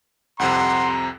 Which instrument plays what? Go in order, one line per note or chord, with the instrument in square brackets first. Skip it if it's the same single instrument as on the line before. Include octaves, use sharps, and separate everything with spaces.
[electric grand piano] C2 F2 C3 [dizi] F#5 [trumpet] A#5 [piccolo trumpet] C6